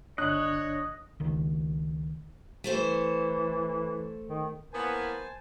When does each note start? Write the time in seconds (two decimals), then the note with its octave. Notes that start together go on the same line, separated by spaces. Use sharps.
0.18 G1 D4 C#5 D#5 F#6
1.20 C#2 D#3
2.64 E3 A3 A4 C5
4.28 D#3
4.73 E3 A#3 B3 A#4 C5 G#5 A5